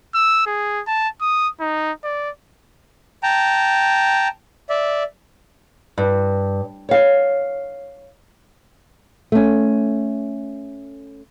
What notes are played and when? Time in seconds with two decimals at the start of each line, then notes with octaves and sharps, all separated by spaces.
0.15 E6
0.46 G#4
0.87 A5
1.21 D#6
1.60 D#4
2.04 D5
3.23 G5 A5 A#5
4.69 D5 E5
5.98 G2
6.89 C#5 F5
9.32 A3 C#4